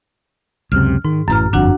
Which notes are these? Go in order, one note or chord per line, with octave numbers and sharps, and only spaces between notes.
C#2 F#2 C3 F6
G#2 D#3
A1 F#2 E3 A#5 F6
G1 F2 D4 F#4 F#5